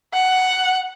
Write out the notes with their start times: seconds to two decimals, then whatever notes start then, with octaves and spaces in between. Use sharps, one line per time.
0.14 F#5